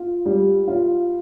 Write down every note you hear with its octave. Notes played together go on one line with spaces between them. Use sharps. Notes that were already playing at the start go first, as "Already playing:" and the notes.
Already playing: F4
G3
F4